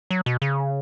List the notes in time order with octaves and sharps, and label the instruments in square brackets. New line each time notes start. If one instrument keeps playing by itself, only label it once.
[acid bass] F#3
B2
C#3